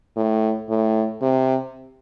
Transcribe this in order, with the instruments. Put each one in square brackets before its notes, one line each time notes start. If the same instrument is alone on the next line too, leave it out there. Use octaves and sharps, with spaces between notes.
[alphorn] A2
A2
C3